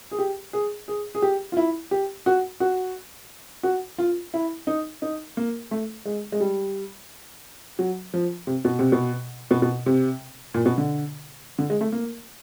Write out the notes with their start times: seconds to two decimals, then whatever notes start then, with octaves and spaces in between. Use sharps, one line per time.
0.11 G#4
0.19 G4
0.53 G#4
0.88 G#4
1.15 G#4
1.22 G4
1.52 F4
1.57 E4
1.91 G4
2.26 F#4
2.60 F#4
3.63 F#4
3.99 F4
4.34 E4
4.67 D#4
5.02 D#4
5.37 A#3
5.71 A3
6.06 G#3
6.32 G#3
6.40 G3
7.79 F#3
8.14 F3
8.47 C3
8.65 B2
8.79 C3
8.92 B2
9.51 B2
9.62 B2
9.86 C3
10.54 A#2
10.66 B2
10.78 D3
11.59 D3
11.70 G#3
11.81 A3
11.92 A#3